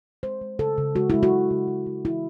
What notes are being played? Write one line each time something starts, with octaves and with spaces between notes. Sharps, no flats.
G#3 C5
G#3
C#3 A4
C#3
G#3 F#4
G#3 E4
F#4
C#3
C#3
G#3
G#3
C#3 E4